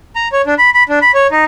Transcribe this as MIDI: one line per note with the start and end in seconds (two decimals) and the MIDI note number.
0.16 0.28 82
0.32 0.42 73
0.46 0.54 62
0.59 0.70 83
0.74 0.83 83
0.89 0.99 62
1.02 1.11 83
1.14 1.27 73
1.32 1.45 63